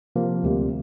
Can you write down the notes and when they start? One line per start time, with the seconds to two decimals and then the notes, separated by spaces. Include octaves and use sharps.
0.16 C3 F3 A#3
0.43 D2 C3 G3